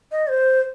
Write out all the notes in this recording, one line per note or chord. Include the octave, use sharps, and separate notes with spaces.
D#5
C5